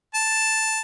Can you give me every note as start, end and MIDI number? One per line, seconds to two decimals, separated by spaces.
0.15 0.80 81